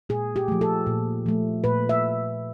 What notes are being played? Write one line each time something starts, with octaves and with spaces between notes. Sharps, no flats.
A#2 G#4
G4
F3 A3
A4
A#2
F3 A3
A#2 B4
E5